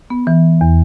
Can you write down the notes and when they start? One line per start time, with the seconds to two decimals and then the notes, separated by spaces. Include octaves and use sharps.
0.10 B3
0.27 E3
0.61 E2